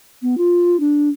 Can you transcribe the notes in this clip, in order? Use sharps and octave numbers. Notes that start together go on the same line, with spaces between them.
B3
F4
D4